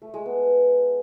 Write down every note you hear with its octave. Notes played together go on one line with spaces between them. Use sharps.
A3
G#3
B3